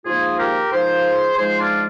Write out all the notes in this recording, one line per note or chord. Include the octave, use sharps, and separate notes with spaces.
G#2 F3 A#3 F4 G#4
G4 A#4
G#2 F3 A#3 G#4 C5
G#2 F3 G#3 G#4 C5
D4 F4